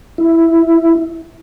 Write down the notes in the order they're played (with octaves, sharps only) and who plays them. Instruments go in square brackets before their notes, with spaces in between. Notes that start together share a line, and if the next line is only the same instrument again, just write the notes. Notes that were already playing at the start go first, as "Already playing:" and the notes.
[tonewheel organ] E4